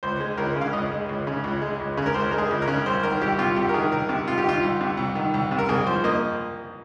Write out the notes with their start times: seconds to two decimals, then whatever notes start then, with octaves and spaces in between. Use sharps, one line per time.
0.03 C#2 C5
0.20 G#3
0.37 C#2 A#4
0.56 C#3
0.61 F5
0.73 C#2 D#5
0.91 G#3
1.09 C#2
1.27 C#3
1.44 C#2
1.62 G#3
1.80 C#2
1.97 C#3
2.06 A#4
2.14 C#2 C5
2.31 G#3 A#4
2.38 G#4
2.51 C#2
2.62 A#4
2.68 C#3
2.86 C2 C5
3.03 D#3 A#4
3.21 C2 G4
3.39 C3 F4
3.56 C2 G4
3.69 A#4
3.74 D#3 G#4
3.91 C2 A#4
4.09 C3
4.27 C2 F4
4.38 G4
4.45 D#3 F4
4.63 C2
4.80 C3
4.97 C2
5.15 D#3
5.34 C2
5.51 C3
5.58 A#4
5.69 C2 G#4
5.86 F3 C5
6.04 A#3 D#5